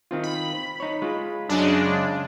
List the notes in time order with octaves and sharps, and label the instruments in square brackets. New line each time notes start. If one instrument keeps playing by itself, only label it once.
[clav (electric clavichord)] D#3 C4 F4
[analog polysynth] B5
[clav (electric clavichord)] D#4 C#5
G#3 F4
[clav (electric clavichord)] F#2 F#3 [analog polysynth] C#3 G#3 D4